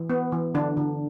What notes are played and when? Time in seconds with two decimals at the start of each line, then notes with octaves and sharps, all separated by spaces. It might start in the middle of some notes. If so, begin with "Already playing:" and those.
Already playing: E3
0.10 B3
0.32 E3
0.54 D3 D4
0.77 D3